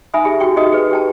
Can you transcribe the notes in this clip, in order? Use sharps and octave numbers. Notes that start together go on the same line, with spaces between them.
D#4 E5 G#5 B5 D#6
G4 G#4
F#4 G4 G5 C#6
D#4 F#4 G#4 D#5 D#6
G#4 B4
G4 G5 A5